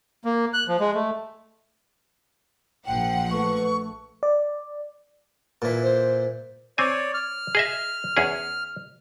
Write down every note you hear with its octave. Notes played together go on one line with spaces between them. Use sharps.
A#3
F#6
F3
G#3
A3
A#1 F3 F#5 G5
A3 B4 C#6
D5
A#2 E3
C5
C4 C#5 D5 G#5
F6
G#4 D#5 E5
E2 C#4 G#4